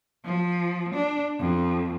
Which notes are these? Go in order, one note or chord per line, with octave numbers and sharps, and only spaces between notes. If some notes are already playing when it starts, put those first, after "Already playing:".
F3
D4
F2